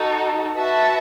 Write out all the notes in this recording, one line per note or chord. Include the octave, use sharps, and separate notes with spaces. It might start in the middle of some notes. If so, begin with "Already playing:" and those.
Already playing: D#4 F#4 A4
F#4 B4 E5 A5